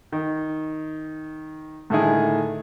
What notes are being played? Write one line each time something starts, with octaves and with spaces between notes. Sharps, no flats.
D#3
A2 D3 D#3 E4 G#4